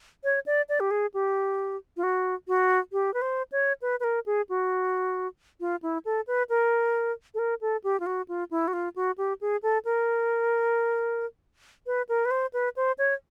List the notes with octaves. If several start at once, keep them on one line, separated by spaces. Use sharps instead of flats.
C#5
D5
D5
G4
G#4
G4
F4
F#4
F#4
G4
B4
C5
C#5
B4
B4
A#4
G#4
F#4
F4
E4
A4
B4
A#4
A4
A#4
A4
G4
F4
F#4
F4
E4
F#4
F4
F#4
G4
G#4
A4
A#4
B4
A#4
B4
C5
B4
C5
C#5